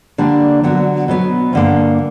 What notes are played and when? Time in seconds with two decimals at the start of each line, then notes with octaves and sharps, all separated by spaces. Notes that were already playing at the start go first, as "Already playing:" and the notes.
0.18 D3 G3 A#3 D4
0.64 D3 F#3 B3 F#4
1.08 B2 F#3 B3
1.53 G2 D3 A#3